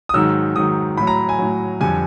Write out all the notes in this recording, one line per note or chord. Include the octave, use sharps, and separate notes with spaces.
D#6
G#2 D#3 F#3 E6
G#2 D#3 F#3 D#6
A2 F#3 B5
A#5
G#5
A2 F#3
F2 D3 G3 G#5